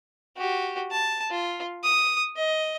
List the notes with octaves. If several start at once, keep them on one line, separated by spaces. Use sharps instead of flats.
F#4 G4
A5
F4
D#6
D#5